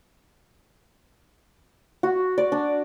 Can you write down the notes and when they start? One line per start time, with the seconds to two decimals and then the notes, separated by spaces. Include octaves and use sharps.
2.03 F#4
2.38 D5
2.52 D4